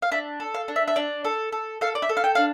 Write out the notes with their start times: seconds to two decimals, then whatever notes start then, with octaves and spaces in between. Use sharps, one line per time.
0.02 F5
0.11 D4 E5
0.40 A4
0.54 F5
0.68 D4
0.76 E5
0.88 E5
0.96 D4 D5
1.25 A4
1.52 A4
1.81 A4 F5
1.95 D5
2.02 E5
2.09 A4
2.17 F5
2.24 G5
2.35 D4 F5